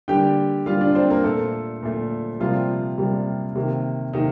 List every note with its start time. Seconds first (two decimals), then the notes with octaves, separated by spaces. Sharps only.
0.08 D3 G3 A#3 G4 G5
0.66 D3 G3 A#3 F4 F5
0.81 D4 D5
0.95 C4 C5
1.10 A#3 A#4
1.24 A#2 A3 A4
1.83 A#2 A3
2.40 C3 F3 G3 A#3 F4
2.98 C3 G3 A#3
3.55 C3 D#3 A#3
4.13 C3 D#3 A#3 D#4